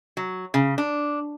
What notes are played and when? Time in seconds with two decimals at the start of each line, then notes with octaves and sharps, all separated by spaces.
0.17 F#3
0.54 C#3
0.78 D4